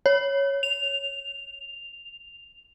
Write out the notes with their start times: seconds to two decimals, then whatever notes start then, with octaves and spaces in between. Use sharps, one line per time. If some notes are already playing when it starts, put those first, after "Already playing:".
0.06 C#5
0.63 F7